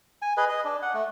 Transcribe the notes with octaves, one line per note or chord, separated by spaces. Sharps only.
G#5
G#4 B4 D#5
D#5
D4
F#5
A3